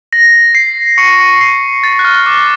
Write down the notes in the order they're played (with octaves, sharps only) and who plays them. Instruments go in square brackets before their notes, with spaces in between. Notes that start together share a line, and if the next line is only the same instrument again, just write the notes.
[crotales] A#6
C7
C#6 C#7
C#6 C#7
C7
A6
F#6
F6
D6